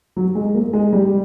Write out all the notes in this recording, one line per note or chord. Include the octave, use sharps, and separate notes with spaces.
F#3
G#3
A#3
G#3
G3